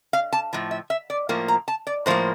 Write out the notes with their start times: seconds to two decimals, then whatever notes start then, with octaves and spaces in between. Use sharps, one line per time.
0.13 F5
0.33 A5
0.53 A2 F3
0.71 E5
0.90 E5
1.10 D5
1.29 A2 F3 A#3
1.48 A#5
1.68 A5
1.87 D5
2.06 A2 F3 A#3 C5